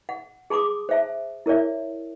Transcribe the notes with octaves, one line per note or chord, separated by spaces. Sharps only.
F#5
G#4 A5 C6 D6 D#6
C5 E5 A5
E4 A#4 C#5 D5 E5